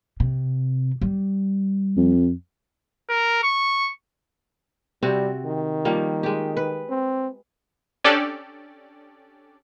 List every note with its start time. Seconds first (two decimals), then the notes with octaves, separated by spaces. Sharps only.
0.20 C3
1.02 G3
1.96 F2
3.10 A#4
3.43 C#6
5.03 C3 G3 C4 F#4
5.45 D#3
5.85 F3 G3 A#3
6.23 G#3 G4
6.57 B4
6.89 C4
8.04 C#4 D4 G4 A4 D5